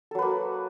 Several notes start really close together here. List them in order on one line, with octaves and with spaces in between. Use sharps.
A4 F#3 B4 A#3